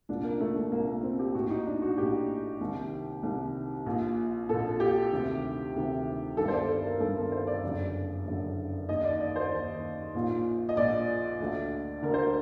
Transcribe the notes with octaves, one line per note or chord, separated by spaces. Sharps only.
C2 A#2 D4
A#3
A3
A3
C2 A#2 A#3
A#3
C4
G4
A#1 A2 F#4
D#4
D4
F#4
A#1 A2 G4
C2 C3 D#3
C2 C3 D#3
A#1 A#2
A#1 A#2 A4
G4
D2 C3 D#3
D2 C3 D#3
G1 G2 D#3 A4
C5
D5
A4
A#4
G1 G2 D#3 A4
A#4
C5
D5
F#1 F#2 D3 D5
F#1 F#2 D3
D#2 D#3 D#5
D5
D5
C5
D#2 D#3
A#1 A#2
D#5
A#1 A#2 D5
D2 D3
D2 D3 A#4
C5
A#4